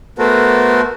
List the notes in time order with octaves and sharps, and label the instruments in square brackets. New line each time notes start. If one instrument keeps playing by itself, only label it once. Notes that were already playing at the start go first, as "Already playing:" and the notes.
[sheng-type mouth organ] A3 B3 F#4 A4 A#4 C5